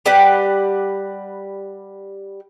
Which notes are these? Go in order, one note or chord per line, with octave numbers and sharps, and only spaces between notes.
G3 G4 B4 F#5